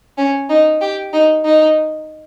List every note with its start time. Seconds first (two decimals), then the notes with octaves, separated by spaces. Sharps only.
0.18 C#4
0.49 D#4
0.81 G4
1.13 D#4
1.45 D#4